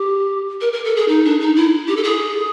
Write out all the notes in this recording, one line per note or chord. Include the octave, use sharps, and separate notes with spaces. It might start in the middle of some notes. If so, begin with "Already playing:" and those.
Already playing: G4
A#4
A#4
A4
G#4
D#4
D4
D#4
E4
G4
A4
G#4